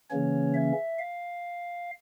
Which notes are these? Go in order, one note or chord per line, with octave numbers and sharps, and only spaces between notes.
C#3 E3 A#3 C#4 C#5
E5
F5